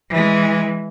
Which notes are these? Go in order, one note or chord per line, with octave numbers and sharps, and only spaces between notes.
E3 G#3